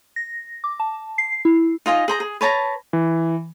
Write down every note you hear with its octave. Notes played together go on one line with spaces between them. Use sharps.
A#6
D6
A5
C7
E4
D#4 F4 D#5 G#5
G#4 C5 A#5
G#4
B4 C#5 A5 A#5
E3